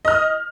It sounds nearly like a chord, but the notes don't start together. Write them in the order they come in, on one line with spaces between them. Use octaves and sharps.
D#5 F6 D#6